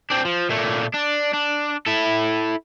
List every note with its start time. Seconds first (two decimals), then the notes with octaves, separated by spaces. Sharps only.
0.10 C4 D4
0.25 F3
0.50 A#2 A3
0.94 D4
1.34 D4
1.86 E4 A4